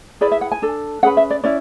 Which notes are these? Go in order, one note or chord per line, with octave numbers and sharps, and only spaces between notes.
E4 G#4 B4 D5
E5
F#5
G#5
D4 A4
C#4 G#4 B4 F#5
E5
D5
C#4 E4 D5